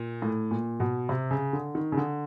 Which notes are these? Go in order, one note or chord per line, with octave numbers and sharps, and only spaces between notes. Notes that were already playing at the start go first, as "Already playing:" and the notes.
Already playing: A#2
A2
A#2
B2
C3
C#3
D3
D#3
C#3
D3